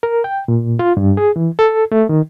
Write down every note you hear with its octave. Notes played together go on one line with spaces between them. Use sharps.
A#4
G5
A#2
F4
G2
G#4
E3
A4
A3
D#3